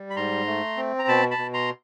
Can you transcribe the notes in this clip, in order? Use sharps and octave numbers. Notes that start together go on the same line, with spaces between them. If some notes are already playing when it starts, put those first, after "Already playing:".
Already playing: G3
B5
G#2 A#5 C6
A3
C4
A#5
B2 A5 B5
A5 B5
B2
A#5 C6